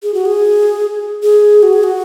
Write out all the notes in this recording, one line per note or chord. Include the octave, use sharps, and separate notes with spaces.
G#4
F#4
G#4
G#4
F#4
G#4
F#4